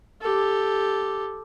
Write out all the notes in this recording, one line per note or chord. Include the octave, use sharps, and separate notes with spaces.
G4 A4